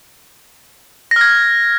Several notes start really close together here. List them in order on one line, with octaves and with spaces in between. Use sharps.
A#6 F6 G#6